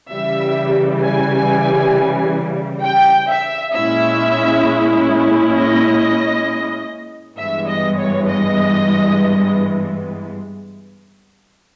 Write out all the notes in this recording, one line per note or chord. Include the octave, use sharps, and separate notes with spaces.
C#3 E3 G3 E5
G#5
G5
E5
A#2 G#3 C#4 E4 E5
D#5
G2 E3 G#3 B3 E5
D#5
C#5
D#5